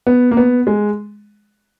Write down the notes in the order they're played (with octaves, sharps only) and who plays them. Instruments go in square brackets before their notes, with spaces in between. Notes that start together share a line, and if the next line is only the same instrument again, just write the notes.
[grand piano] B3
A#3
B3
G#3